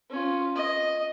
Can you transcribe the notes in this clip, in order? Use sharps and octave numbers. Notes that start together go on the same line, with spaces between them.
C#4 F4
D#5